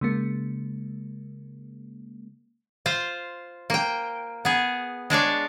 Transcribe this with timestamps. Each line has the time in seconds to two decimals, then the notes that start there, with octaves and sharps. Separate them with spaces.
0.01 C#3 G#3 A#3
2.86 F4 C5
3.70 A#3 G5
4.45 B3 G#4
5.10 G#3 D4 C#5 D5